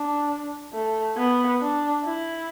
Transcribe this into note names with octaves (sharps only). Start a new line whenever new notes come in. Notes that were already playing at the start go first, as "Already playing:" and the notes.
Already playing: D4
A3
B3
D4
E4